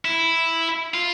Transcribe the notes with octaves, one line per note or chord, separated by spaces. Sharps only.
E4
F4